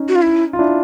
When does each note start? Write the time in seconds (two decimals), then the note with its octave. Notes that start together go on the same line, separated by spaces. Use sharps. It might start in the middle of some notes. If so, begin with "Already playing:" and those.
Already playing: C#4 D#4
0.09 F#4
0.16 F4
0.22 E4
0.53 F4
0.59 D4 E4